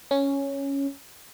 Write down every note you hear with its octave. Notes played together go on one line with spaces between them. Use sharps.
C#4